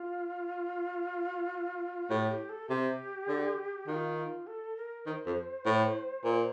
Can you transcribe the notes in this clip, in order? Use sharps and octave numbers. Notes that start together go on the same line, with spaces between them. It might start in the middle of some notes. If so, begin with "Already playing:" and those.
Already playing: F4
A2 G4
G4
A4
C3 G4
D3
D#3 F4
F4
A4
A#4
D#3 C5
F2
A2
A#2